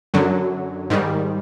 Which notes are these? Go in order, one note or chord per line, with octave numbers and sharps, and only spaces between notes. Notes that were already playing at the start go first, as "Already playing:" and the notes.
F#2 D3 F#3
G#2 D#3 G3